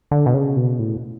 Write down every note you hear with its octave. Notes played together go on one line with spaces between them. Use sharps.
D3
B2
C#3
B2
A2